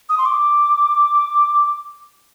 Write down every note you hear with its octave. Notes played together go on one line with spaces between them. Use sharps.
D#6
C6
D6